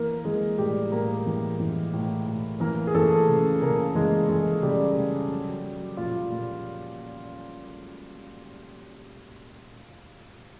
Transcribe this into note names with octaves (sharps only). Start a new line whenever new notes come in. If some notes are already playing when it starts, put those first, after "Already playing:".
Already playing: E3 A#3 A#4
E3 G#3 G#4
A2 G3 G4
A2 A#3 A#4
E3
E3
A2
A2
E3 A#3 A#4
G#4
E3 A3 A4
C#3
C#3 A#3 A#4
E3 G#3 G#4
E3 G#3 G#4
C#3 G3 G4
C#3
F#3
F#3
A#2 F3 F4
A#2